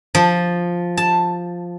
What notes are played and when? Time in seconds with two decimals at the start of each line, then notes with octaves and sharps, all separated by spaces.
0.15 F3
0.97 A5